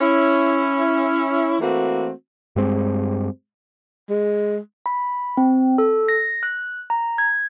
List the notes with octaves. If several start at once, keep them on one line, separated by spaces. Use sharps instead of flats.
C#4 E4
E3 A3 A#3 C4 F#4
G2 G#3 C4
G#3
B5
C4
A4
A#6
F#6
A#5
G#6